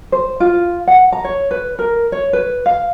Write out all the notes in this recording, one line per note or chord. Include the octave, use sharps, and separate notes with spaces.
C5
F4
F#5
A#5
C#5
B4
A#4
C#5
B4
F5